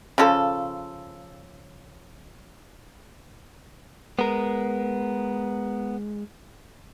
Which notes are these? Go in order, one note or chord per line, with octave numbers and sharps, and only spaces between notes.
C#3 F3 F4 A4
G#3 B3 A#4